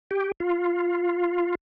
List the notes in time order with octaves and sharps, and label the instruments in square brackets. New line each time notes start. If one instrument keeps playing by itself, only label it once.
[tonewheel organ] G4
F4